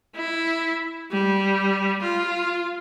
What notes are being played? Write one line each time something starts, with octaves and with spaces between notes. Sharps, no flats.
E4
G3
F4